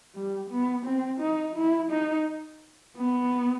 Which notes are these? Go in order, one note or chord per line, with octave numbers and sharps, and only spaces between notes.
G3
B3
C4
D#4
E4
D#4
B3